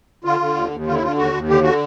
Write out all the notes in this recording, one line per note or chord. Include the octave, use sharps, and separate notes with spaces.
D3 F4
D3
D#2
D#2
D3 F4
E4
D3 F4
D#2 F#4
D#2
D3 G4
D3 F#4